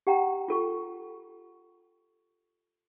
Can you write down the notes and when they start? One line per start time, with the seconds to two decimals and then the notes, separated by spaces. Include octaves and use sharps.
0.07 G4 F#5 G5 A#5
0.48 F4 A4 C#6